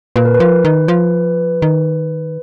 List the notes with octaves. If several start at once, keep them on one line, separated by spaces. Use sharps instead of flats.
A#2 B4
A#4
B4
F3
D#3
F3
D#3